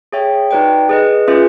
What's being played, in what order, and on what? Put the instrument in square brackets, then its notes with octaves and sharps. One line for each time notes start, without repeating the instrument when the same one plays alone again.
[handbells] G#4 C#5 E5 G5
D#4 F#4 B4 D5 G5
G#4 B4 D#5
C#4 F4 G#4 B4 E5